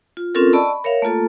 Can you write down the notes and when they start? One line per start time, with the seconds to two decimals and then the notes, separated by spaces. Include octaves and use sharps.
0.17 F4
0.35 C4 C#4 F4 A4 A#4
0.53 D5 D#5 A5 B5 C#6 E6
0.67 B5
0.84 A#4 C#5 E5 F5
1.02 A3 A#3 F4 A4